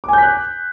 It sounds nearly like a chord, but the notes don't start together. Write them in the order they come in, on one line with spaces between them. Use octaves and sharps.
D6 G#5 G6 B6 F#6